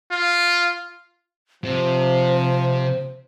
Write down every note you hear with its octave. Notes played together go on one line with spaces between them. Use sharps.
F4
C3 F3 C5